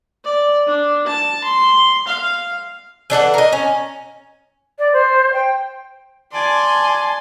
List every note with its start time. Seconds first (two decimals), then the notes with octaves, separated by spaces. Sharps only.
0.25 D5
0.67 D4
1.07 A5
1.44 C6
2.08 F5
3.10 E3 D4 A4 F#5
3.34 A#4 D#5
3.52 C#4
4.79 D5
4.93 C5
5.33 G5
6.34 D5 G#5 A5 C6